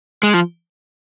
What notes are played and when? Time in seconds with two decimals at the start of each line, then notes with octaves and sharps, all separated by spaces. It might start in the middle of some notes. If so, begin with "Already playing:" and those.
0.23 G#3
0.34 F3